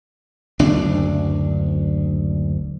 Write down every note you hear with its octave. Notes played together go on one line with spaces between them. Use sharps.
F#1 D2 D4